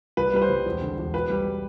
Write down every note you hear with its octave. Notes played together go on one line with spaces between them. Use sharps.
C2 B4
G3 B4
C5
C2
E1
D3
E1
B1 B4
G3